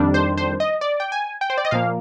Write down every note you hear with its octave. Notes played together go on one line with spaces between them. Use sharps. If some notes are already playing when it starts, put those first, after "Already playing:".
Already playing: F2 D#3 G3 D4
C5
C5
D#5
D5
G5
G#5
G5
C5
D5
D#5
A#2 F3 A#3 F5